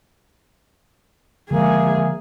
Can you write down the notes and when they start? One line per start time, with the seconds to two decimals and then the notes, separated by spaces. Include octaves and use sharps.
1.51 D3 D#3 F3 G#3 A#3 G#4 E5